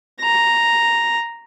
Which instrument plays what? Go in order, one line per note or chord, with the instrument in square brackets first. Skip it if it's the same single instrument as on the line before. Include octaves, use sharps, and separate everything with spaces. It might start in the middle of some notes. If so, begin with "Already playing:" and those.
[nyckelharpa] A#5